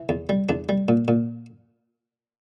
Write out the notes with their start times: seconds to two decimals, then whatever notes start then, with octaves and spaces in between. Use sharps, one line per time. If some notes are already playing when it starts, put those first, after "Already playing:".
Already playing: E3
0.09 E2
0.29 G3
0.49 E2 D4
0.69 G3
0.88 A#2
1.08 A#2